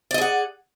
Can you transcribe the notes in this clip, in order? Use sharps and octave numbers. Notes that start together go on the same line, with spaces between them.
G#4 D5 D#5 F#5